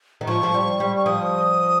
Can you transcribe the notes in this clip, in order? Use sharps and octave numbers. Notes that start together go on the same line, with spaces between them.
D#3
F3 C#6
F3
G3
G3
C#6
F3 D#6